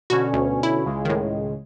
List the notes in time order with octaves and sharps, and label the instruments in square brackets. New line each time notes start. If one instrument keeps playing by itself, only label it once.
[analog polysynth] B2 D3 C#4 [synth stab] F#4
[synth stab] D2
E4
[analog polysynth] C#2 C#3 G#3
[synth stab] A2 D#3